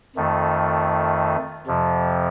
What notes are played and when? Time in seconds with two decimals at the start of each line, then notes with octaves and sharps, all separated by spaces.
0.16 F2 D#3 A3
1.67 F2 C3 F3